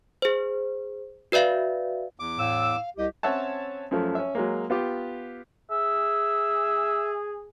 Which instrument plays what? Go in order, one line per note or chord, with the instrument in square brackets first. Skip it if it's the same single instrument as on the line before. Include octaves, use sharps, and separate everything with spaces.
[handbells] G#4 C5
F#4 B4 D5 E5 F5
[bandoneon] E2 D6
[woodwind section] A2 E6 [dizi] F5
[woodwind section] C2 G4 [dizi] D#5
[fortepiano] C4 C#4 C#5 E5 F#5 A5
F#2 F3 A3
C#4 E5
F#3 G#3 A#3
B3 F4 G4
[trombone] G#4 [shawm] E5